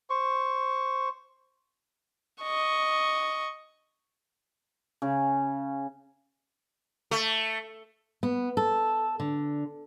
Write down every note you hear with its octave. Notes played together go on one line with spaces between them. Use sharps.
C5 C#6
D#5 C#6
C#3
A3
B3
A4
D3